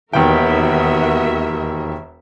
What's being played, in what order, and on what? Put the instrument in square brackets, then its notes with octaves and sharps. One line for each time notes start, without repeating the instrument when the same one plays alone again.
[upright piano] E1 D#3 G5 [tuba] D#2 [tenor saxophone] B3 [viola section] F#4 A#4 E5